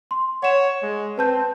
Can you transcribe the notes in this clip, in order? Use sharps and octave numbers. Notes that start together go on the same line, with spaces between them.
C6
C#5 F#5 E7
G#3
C4 B4 A5 G6